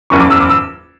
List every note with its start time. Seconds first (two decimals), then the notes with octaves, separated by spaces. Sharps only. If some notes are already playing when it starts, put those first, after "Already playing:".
0.10 F#1 E2 C#3 C#6
0.20 D6
0.30 E6
0.40 D6
0.49 E6